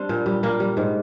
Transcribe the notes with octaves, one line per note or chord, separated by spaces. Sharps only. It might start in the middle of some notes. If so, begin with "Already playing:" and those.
Already playing: G3 C4 D4
A#2
G3
A#2 A#3
G3
G#2